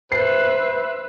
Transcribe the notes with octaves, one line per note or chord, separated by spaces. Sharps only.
B4 C5 E5 C7